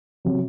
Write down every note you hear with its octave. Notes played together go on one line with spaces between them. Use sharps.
C3 F#3